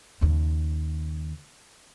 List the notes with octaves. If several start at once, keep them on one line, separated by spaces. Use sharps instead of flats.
D#2 C#3